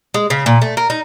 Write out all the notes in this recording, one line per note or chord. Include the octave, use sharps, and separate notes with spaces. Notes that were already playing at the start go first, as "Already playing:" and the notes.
G#3
C#3
A#2
A3
A#4
D#4